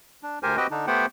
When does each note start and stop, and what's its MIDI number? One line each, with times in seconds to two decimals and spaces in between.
0.23 0.39 62
0.43 0.57 38
0.43 0.57 67
0.43 0.57 70
0.43 0.57 72
0.43 0.57 80
0.57 0.67 60
0.57 0.67 66
0.57 0.67 67
0.57 0.67 71
0.57 0.67 75
0.57 0.67 79
0.71 0.86 50
0.71 0.86 62
0.71 0.86 63
0.87 1.06 57
0.87 1.06 59
0.87 1.06 67
0.87 1.06 72
0.87 1.06 78
0.87 1.06 79